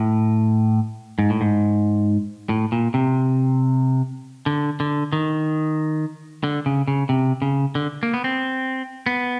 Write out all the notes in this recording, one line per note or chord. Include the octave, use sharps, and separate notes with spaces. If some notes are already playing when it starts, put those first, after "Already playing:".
Already playing: A2
G#2
A2
G#2
A2
A#2
C3
D3
D3
D#3
D3
C#3
C#3
C3
C#3
D3
A#3
B3
C4
B3